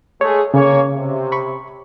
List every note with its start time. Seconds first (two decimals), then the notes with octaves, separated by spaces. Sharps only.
0.21 G#3 A3 G#4 C#5
0.54 C#3 A#3 C#4 C#5
0.94 C3
1.32 B5 C#6